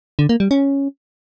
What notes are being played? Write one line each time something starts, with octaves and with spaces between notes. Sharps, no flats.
D3
A#3
G3
C#4